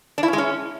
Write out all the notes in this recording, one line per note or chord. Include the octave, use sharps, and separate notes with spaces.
D4
E4
C#4
G#3
C#4